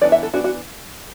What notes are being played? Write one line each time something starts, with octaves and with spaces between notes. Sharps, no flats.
E3 B3 D4 D5
E5
A4
E3 B3 D4 F#4
F#4